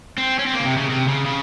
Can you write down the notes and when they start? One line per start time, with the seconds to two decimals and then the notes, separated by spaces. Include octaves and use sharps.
0.18 C4
0.39 C#4
0.47 C4
0.54 A#3
0.60 C#3
0.65 C3
0.77 C#3
0.90 C3
1.08 C#3
1.26 C#3